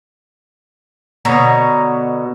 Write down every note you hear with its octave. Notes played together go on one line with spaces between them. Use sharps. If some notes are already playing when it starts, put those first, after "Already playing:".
B2 D3 C#5 A#5